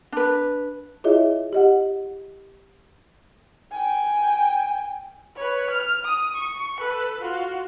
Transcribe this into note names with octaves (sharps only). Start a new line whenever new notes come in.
D4 B4
E4 F4 G#4 C#5 D#5 E5
G4 D#5 F#5
G5 G#5
B4 C#5
F6
D#6
C#6
A4 B4
F4 F#4